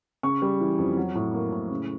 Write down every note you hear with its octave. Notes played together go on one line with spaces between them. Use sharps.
C#3 C#6
G3
E3
F2
F#3
A2
A#3
A2
C#3